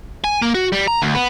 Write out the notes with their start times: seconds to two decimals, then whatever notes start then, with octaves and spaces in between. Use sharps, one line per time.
0.24 G#5
0.42 A#3
0.55 F#4
0.73 G3
0.88 A#5
1.02 D2
1.15 B3